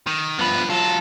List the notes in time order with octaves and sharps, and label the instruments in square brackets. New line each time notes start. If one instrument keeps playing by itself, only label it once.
[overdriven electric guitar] D#3
[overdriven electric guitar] G2 B4 [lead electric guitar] F3 B3
[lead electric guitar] F#3 F4 [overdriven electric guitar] A4